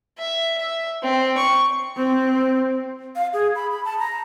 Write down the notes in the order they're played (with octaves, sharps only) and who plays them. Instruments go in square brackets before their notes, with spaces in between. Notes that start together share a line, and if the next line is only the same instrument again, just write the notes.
[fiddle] E5
E5
C4
C#6
[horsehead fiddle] C4
[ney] F5
G#4
B5
B5
A5
A#5